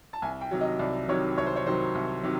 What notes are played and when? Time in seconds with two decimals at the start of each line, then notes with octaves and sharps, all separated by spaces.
0.13 A5
0.22 C2 G#5
0.41 G5
0.51 C3 D#3 F#3
0.61 D#5
0.79 C2 D5
1.08 C3 D#3 F#3 C#5
1.38 C2 C#5
1.46 C5
1.56 C#5
1.66 C3 D#3 F#3 C5
1.95 C2
2.23 C3 D#3 F#3